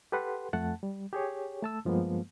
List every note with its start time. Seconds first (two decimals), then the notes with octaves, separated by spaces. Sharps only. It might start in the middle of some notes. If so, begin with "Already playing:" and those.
0.12 G4 A4 B4 F#5 C6
0.53 F2 A3 F#5 A5
0.83 G3
1.13 G4 G#4 C#5
1.62 A3 A5 E6
1.85 G2 F3 G#3 A#3 B3